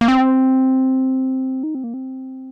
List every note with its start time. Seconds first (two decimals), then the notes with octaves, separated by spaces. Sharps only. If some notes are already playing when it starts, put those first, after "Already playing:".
0.01 A#3
0.08 C4
1.63 D#4
1.75 C4
1.84 A#3
1.94 C4